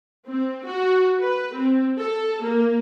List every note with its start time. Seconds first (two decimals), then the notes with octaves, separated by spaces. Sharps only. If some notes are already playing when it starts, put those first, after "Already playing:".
0.27 C4
0.66 F#4
1.19 B4
1.54 C4
1.99 A4
2.43 A#3